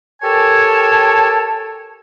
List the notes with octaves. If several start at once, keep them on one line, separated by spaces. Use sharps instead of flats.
G4 A4 A#4 C#5 G#5 A5